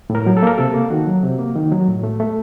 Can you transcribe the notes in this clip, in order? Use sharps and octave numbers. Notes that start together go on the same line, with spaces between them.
A2
A#4
F#3
A4
A#3 A#4
C3 A4
A#3
D#3 F#4
F#3
C3
A#3
D#3
F#3
A2
A3
A3